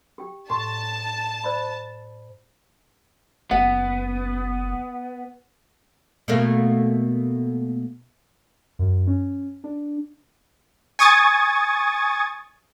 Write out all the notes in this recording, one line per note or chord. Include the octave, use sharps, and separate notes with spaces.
G4 G5
A2 A5 C6
C5 D5 B5
F#1 B3 F#5
B2 A3 A#3
F#2
C#4
D4
G#5 C#6 D#6 G#6 A6